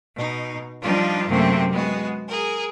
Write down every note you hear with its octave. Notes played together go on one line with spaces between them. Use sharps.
B2 D#4
F3 G3 D4 D#4 F4
F#2 C3 A3 A#3 C4
G#3 B3 F#4
G#4 A#4